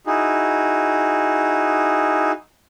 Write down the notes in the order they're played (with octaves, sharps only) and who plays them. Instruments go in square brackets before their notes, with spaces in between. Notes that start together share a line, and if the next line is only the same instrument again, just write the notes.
[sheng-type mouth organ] D#4 E4 F#4 G#4